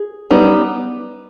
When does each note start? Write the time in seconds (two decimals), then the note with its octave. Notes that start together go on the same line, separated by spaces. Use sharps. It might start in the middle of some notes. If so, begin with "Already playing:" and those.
Already playing: G#4
0.31 G3 B3 D#4